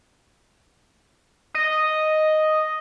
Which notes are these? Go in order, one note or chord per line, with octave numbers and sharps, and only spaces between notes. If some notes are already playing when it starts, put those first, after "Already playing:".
D#5